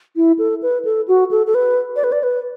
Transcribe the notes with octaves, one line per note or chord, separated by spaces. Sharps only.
E4
A4
B4
A4
F#4
A4
A4
B4
D5
B4
D5
B4